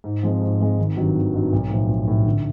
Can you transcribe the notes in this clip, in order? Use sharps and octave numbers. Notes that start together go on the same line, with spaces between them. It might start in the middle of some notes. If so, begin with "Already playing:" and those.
G#2
F3 G#3 C4
G#2
F3 G#3 C4
G#1
G2 D#3 F#3
G#1
G2 D#3 F#3
B1
A2 F3
B1
A2 F3
D3